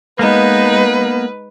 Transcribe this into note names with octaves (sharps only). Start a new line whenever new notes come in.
G#3 A#3 B3 D#4 B4